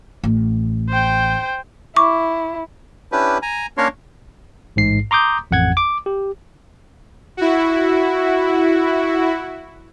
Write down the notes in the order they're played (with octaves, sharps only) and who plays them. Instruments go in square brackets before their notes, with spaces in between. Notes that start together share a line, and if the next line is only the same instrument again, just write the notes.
[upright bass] A1
[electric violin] C5 G5
[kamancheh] E4 [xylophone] C#6 D6
[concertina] C#4 D4 E4 G4 B4
G#5 A#5
A#3 C#4 D4 A#4 C#5 C6
[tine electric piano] A1 G#2 C7
A#5 C6 D6 D#6 G6
A1 F2 F#5 G#6
D6
G4
[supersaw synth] E4 F#4